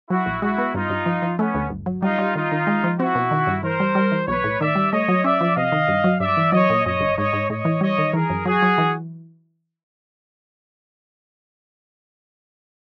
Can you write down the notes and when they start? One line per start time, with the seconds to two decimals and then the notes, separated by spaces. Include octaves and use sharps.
0.09 F#3 E4 F#4
0.26 A#1
0.42 G#3 E4 F#4
0.58 B3
0.74 G2 D#4 F4
0.90 G2
1.06 F3
1.22 F3
1.38 A3 B3 C#4
1.54 D2
1.70 G1
1.86 F#3
2.02 G3 D#4 F4
2.18 G3
2.35 D#3 D#4 F4
2.52 D#3
2.67 G#3
2.84 F3
2.99 C4 E4 F#4
3.15 B2
3.31 D#3
3.47 G2
3.63 E3 A#4 C5
3.80 G3
3.95 G3
4.12 E3
4.27 B1 B4 C#5
4.44 A2
4.60 D#3 D5 E5
4.76 G3
4.92 A3 C#5 D#5
5.08 F#3
5.24 C#4 D5 E5
5.41 F3
5.56 C3 D#5 F5
5.72 D#3
5.88 G2
6.04 F#3
6.20 G2 D5 E5
6.37 E3
6.52 F#3 C#5 D#5
6.70 A#2
6.85 F#2 C#5 D#5
7.01 G1
7.17 G#2 C#5 D#5
7.33 G#2
7.49 A2 C#5 D#5
7.65 E3
7.81 G3 C#5 D#5
7.98 D#3
8.13 E3 G#4 A#4
8.30 F#2
8.45 F#3 F#4 G#4
8.62 F#3
8.78 E3